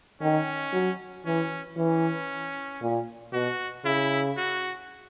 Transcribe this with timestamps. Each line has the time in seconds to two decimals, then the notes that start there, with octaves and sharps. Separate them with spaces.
0.21 D#3 C#4
0.73 F#3
1.26 E3 C#4
1.77 E3 C#4
2.82 A#2
3.32 B2 F#4
3.85 C#3 E4
4.37 F#4